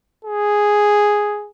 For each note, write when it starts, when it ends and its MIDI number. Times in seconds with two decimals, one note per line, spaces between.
0.25 1.49 68